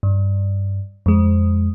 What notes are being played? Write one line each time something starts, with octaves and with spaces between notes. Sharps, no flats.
G2
F2 G#3